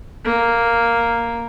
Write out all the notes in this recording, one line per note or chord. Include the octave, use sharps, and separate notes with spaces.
A#3